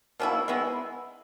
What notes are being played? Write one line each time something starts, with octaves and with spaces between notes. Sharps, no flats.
B2 A#3 C#4 E4
G#3 B3 E4